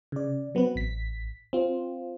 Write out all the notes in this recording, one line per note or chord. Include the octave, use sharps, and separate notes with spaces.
C#3 D5
F#3 B3 C4 B4
A1 B6
C4 F4